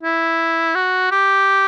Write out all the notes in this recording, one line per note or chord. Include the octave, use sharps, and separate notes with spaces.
E4
F#4
G4